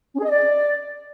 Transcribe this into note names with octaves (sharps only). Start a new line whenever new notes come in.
C#4
G#4
D#5
D5